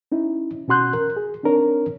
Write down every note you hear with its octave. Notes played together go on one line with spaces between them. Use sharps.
C#4 D#4 E4
B2 C#4 F#4 C6 F#6 G6
A#4
G#4
C4 D4 D#4 A#4 C#5